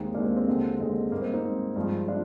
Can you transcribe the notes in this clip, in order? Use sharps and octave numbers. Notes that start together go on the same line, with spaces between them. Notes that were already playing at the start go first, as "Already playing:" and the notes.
Already playing: D#2 D#3 G#3 C4 D#4
D#2 D#3 G#3 A#3 D4
C4
C4
D#2 D3 G#3
D#2 D3 G#3
G#2 G3 A#3
C4
C4 D#4
G#2 G3
G2 F3 G#3
D4 F4